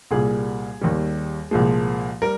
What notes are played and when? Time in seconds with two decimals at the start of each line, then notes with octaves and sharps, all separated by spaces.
0.11 C2 A#2 G3 G#4
0.81 D#2 D#3 G3
1.51 C2 A#2 F3 G#3
2.22 G3 A#4